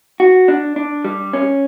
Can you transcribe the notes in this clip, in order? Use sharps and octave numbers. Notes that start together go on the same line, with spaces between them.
F#4
D4
D4
G3
C#4